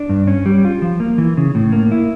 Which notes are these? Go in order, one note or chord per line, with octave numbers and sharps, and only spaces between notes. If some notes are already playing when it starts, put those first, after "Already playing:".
Already playing: D4
G2
C#4
G3
F4
F3
A#3
E3
C#3
A2
A#3
E4